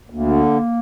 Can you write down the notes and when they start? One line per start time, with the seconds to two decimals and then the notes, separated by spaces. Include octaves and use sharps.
0.10 D2 A#3
0.26 D3